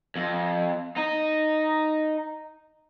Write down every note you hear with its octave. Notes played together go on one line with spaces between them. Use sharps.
F2
D#4